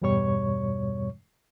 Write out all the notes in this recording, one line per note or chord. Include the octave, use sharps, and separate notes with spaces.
E2 G2 B2 G3 C#5 C#6